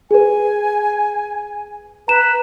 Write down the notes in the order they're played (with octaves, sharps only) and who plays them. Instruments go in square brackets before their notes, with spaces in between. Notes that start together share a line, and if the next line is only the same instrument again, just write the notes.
[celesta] G#4 B4 [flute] G#5
[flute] B4 [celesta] A#5 E7